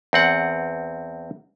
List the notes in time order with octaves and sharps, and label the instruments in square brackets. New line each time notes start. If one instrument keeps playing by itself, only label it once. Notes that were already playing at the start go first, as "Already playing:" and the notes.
[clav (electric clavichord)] E2 C4 F#5